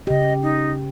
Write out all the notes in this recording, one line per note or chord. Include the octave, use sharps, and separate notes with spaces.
C#3 G4 D#5
D#4